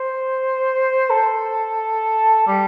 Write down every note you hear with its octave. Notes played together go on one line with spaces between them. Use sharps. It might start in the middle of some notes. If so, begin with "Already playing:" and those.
Already playing: C5
A4
G3